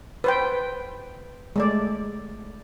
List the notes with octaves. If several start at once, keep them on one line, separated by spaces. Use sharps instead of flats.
B4 C5 G5
G#3 A3 D5